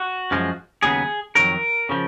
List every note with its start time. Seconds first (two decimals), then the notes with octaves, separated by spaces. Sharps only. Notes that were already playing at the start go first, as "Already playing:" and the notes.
Already playing: F#4
0.31 F#2 F3 G#3
0.83 D#2 C#3 F#3 B3 G#4
1.35 F2 D#3 F#3 A#4
1.89 C#3 F3